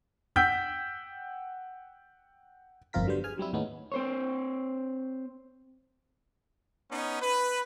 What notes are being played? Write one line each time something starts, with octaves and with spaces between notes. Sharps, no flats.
F#5 G5 E6 G6 B6
G1 F2 C4 F4 A#4 B6
D3 F#3 G3 B3 C5
G#4 G#5 F6
F#3 G3 C4 E4
D#2 A2 G#3 B3 C#4 D#4
C4 C5 C#5
B3 C#4 D#4
B4